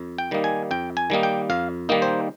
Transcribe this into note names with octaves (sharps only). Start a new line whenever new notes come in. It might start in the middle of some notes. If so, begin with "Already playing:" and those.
Already playing: F2
G5
D#3 G3 A#3 D#4
G#5
F2 G5
G#5
D#3 G3 A#3 D#4
G5
F2 F5
D#3 G3 A#3 D#4
C5